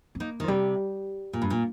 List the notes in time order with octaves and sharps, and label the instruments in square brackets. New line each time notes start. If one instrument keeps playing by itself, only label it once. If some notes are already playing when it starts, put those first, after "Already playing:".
[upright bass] C4
[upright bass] A#3 [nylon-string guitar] D#4
[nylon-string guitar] D#3
[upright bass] F3
[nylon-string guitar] C3 [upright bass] G3
[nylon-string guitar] A#2
G2
A#2